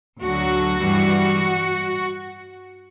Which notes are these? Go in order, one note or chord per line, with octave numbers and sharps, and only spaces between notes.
D2 D3 F#3 F#4
G2 E3 G3